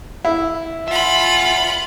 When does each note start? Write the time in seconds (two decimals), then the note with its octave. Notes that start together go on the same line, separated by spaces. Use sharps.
0.25 E4
0.88 F4 E5 F#5 B5